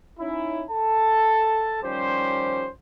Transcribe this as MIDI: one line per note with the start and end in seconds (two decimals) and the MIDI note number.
0.19 0.64 61
0.19 0.64 63
0.19 0.64 64
0.71 1.79 69
0.71 1.79 81
1.83 2.70 51
1.83 2.70 53
1.83 2.70 55
1.83 2.70 61
1.83 2.70 67
1.83 2.70 72